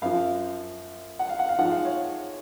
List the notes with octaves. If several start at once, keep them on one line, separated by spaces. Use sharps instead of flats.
F#2 F3 F5
F#5
F5
F#5
F5
G#2 F3 F#5
F5
C#5